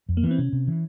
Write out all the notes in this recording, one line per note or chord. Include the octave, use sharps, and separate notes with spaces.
F2
A#3
E3 B3
C4
C3 C#4
C3
E3